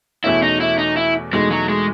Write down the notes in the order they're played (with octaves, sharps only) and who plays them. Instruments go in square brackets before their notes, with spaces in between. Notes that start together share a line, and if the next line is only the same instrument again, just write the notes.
[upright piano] E2 B2 A3 C#4 [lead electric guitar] E4
[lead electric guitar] D#4
E4
D#4
E4
[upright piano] E2 B2 A3 D#4 [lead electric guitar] G#3
[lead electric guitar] F#3
G#3